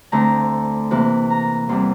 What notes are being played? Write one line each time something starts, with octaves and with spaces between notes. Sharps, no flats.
D2 D3 A3 C4 A#5
C3 E3 A#3
A#5
E2 E3 G3 C4 C6